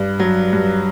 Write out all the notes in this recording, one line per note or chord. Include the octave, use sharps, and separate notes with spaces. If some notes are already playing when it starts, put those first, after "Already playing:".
Already playing: G2
F#3
G2